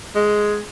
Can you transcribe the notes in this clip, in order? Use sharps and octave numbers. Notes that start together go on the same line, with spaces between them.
G#3